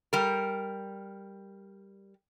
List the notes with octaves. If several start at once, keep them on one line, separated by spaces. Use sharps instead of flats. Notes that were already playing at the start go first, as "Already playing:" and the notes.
G3 A#4